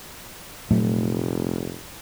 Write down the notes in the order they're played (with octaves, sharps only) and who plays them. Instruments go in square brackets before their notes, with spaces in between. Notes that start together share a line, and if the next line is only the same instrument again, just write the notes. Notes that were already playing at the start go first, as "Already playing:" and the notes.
[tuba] F1 [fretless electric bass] A#2 F#3 A3